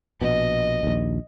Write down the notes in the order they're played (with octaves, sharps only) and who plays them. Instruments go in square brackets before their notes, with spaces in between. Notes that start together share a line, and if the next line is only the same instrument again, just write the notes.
[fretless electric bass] A#1 B2 [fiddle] D#5
[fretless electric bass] A#1 D#2